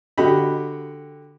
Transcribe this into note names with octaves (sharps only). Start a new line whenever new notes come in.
D3 F#4 G4 D#5 B5